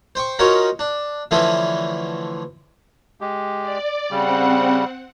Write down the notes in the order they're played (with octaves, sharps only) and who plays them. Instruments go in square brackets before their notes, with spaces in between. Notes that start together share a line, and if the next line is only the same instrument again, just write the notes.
[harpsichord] C5 G5 C#6
C#4 D#4 F4 F#4 A#4 C#5
D4
D3 E3 F3 A3 C#4 E4
[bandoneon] G#3 G4
[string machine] D5
[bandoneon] C#3 G3 [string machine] C4 F#5